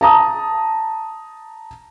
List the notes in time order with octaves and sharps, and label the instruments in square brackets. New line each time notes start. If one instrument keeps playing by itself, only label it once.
[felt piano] A5 A#5 D#6